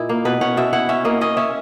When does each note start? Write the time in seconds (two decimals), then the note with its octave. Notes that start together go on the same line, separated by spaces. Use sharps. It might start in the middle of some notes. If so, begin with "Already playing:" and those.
Already playing: A#2 E4 D#5
0.09 A#3
0.25 B2 B4
0.41 C#4 F#5
0.57 B2 E5
0.73 E4 F#5
0.89 C#4 E5
1.05 A#3 D#5
1.21 C#4 D#5
1.37 C#4 E5